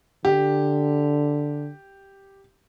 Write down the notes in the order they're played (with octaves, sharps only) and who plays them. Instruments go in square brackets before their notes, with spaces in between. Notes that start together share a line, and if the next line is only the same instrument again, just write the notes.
[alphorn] D3 [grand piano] G4